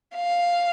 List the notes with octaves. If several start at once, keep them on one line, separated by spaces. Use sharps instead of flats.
F5